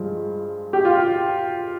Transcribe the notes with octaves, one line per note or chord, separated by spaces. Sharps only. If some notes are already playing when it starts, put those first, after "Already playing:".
Already playing: G2 F3 G#3
G4
F4